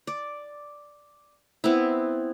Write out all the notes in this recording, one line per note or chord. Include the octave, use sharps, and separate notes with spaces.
D5
B3 C4 E4